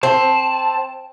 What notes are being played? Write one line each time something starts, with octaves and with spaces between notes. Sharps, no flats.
C4 A5